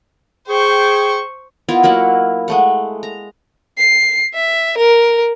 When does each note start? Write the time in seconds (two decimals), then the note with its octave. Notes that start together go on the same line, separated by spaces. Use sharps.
0.48 G#4 C5 G5 C#6
1.69 B3 E4 F4 A#4
1.83 F#3 A#3 E4 F#5
2.48 G#3 A3 F#5
3.03 A#5
3.78 C7
4.34 E5
4.77 A#4